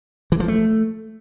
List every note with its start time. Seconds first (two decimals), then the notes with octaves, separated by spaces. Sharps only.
0.32 E3
0.40 F3
0.48 A3